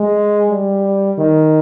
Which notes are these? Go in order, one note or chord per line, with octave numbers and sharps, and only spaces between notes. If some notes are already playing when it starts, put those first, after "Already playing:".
Already playing: G#3
G3
D#3